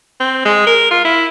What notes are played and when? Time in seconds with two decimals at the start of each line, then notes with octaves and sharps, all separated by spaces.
0.20 C4
0.45 G#3
0.67 A#4
0.91 F4
1.05 E4